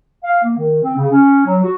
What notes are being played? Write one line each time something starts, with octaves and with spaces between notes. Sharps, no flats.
F5
A#3
D#3
C4
C#3
C#4
F#3
F#4